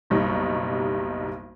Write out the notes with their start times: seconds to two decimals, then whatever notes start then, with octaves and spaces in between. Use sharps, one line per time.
0.10 F#1 B1 G3 D#4 C#6